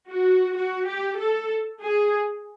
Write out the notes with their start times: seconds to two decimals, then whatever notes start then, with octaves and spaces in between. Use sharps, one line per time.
0.09 F#4
0.56 F#4
0.87 G4
1.18 A4
1.81 G#4